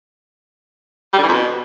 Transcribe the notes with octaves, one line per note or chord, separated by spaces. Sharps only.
G3
D3
E3
F2
B2